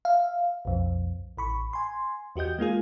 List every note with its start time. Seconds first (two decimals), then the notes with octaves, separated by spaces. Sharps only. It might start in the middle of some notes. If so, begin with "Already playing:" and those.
0.05 E5 F5
0.65 B1 F2
1.37 A1 B5 C#6
1.73 G#5 C6
2.36 E2 F#4 G4 D#5 G6
2.59 G#3 A#3 F4 G#4